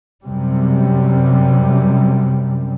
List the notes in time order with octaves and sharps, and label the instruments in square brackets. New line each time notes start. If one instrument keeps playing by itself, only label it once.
[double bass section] F#2 C3 G3